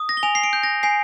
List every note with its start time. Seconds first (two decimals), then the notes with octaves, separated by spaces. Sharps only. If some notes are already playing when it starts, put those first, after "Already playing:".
Already playing: D#6
0.09 A#6
0.17 G7
0.23 G#5 F7
0.35 C7
0.43 D7
0.53 G6
0.63 A#6
0.83 G#5 C7